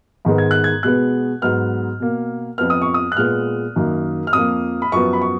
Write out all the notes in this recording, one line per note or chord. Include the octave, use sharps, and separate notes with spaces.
G#2 D#3 G#3 B3
G#6
F#6
G#6
B2 G#3 B3 F#6
G#2 F#3 B3 F6
B2 A#3
F2 F3 B3 F6
D#6
C#6
D#6
F#6
A#2 G#3 B3 F6
F#2 D#3 A#3
F6
F2 F3 A#3 D#6
B5
F#2 F3 B3 C#6
B5
C#6